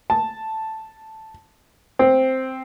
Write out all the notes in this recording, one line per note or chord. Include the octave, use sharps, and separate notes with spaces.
A5
C4